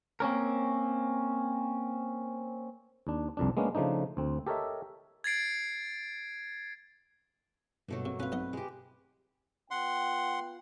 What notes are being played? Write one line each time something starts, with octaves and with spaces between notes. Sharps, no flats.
A#3 C4 C#4 A#4
D#2 D4
C2 F2 D4
G#3 A#3 B3 C#4 D4
C#3 F3 A3 D4 D#4
D2 C4
G4 A4 A#4 C#5 D#5 E5
G#6 A6 C7 D7
G2 B2 F#3 A3 A#3
C3
C4 C#4 F4 B4
B1 B3 D#5
G#3 G4
B3 F4 F#5 G5 C6